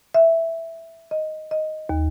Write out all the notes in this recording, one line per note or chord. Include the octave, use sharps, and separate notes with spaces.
E5
D#5
D#5
D#2